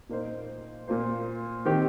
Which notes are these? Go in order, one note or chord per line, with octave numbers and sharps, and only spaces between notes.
A#2 A#3 D#4 C5
A#2 A#3 F4 C5
D#3 C4 G4